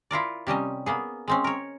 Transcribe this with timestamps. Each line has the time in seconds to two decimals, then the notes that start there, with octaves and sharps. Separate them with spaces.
0.11 E4 F4 A#4 D5
0.47 C3 G3 C#4 D#5
0.86 A#3 B3 G#4
1.28 G#3 C4 C#4
1.44 A#4 C#5